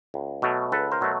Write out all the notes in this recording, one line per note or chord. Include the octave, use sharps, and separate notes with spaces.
C#2
B2 F#3 A3
C#2 A4 B4
A#4 C5
B2 F#3 A3